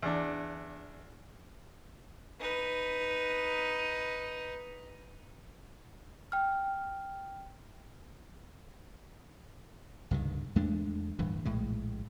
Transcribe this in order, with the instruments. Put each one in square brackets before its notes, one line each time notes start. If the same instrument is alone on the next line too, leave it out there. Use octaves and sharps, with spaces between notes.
[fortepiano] E2 D4
[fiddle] D#4 B4
[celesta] G5 F6
[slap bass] C#2 G2 C3 D#3
E2 G#3 A3 D4
D1 G2 E3
A#1 A2 G#3